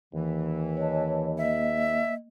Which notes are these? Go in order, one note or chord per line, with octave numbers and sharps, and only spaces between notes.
D#2 E3
C#5 D#5 A5
A#3 D#5 E5